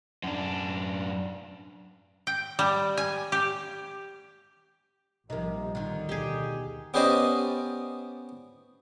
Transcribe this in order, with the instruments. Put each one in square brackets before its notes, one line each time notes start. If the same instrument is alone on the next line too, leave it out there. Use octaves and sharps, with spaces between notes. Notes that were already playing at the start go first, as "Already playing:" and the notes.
[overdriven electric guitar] F#2 D4
[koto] G5
G3
G#5
G4
[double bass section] A#1 F3 G3 [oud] C3 A#3 [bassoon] D#4
[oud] D3 D#3 [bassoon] D#4
[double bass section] D2 B2 [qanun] G4 G#4
[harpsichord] B3 C#4 G4 C5 D5 D#5